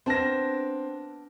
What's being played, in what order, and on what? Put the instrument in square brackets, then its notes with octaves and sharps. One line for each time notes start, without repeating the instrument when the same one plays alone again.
[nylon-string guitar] B3 D4 A5 [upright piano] C4 A#6